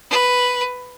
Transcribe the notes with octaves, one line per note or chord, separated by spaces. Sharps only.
B4